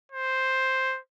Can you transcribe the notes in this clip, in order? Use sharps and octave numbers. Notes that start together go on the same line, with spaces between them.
C5